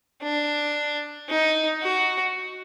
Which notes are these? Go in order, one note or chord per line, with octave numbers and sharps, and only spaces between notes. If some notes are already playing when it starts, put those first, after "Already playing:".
D4
D#4
F#4